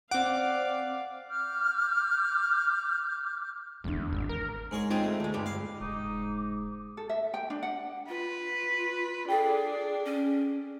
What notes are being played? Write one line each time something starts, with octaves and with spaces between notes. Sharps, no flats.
C4 D5 F5 F#5 D6
D6 F6 G6
E2 D3 D4
G#1
A#4
G#2 G#4 C#5
C4 D#4 F4 G#4
A3
D2 G#3
G2 G#3 G4
F5
F1 G#2 D#4 D6
A4
E5
G5
D4
F#5
F4 B4
D4 G#4 A4 G5
C#4